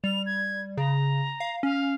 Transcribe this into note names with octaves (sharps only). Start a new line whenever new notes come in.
G3 F7
G#6
C#3 A#5
F5
C#4 F5